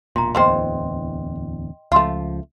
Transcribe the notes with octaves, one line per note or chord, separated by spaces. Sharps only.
E1 A#2 A#5 C6
D1 E2 C#3 A#3 C5 D#5 G5 C6
C#2 F3 A3 F4